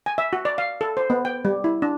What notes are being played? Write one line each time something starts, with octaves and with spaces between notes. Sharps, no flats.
G#5
E5
F#4
D5
F5
A4
C5
B3
G5
G3
E4
D4